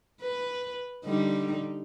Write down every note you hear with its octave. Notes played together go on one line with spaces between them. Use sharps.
B4
D3 G3 D#4